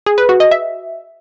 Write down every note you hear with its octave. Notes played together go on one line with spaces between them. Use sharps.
G#4
B4
F#4
D#5
E5